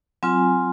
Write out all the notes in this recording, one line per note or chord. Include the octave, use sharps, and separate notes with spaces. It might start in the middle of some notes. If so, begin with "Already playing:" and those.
F#3 C4 F4 G#5